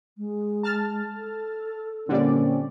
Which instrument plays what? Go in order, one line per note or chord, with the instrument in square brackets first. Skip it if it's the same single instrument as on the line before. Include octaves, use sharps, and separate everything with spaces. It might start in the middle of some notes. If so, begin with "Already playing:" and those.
[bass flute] G#3
[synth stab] A5 F6 A6
[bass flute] A4
[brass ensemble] A#2 C4 C#4 [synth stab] D3 G3 D5